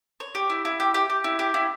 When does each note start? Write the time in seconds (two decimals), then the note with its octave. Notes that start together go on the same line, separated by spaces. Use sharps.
0.20 C#5
0.35 G4
0.50 E4
0.65 E4
0.80 G4
0.94 G4
1.10 G4
1.24 E4
1.39 G4
1.54 E4